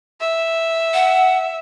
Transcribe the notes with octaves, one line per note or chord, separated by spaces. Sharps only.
E5
F#5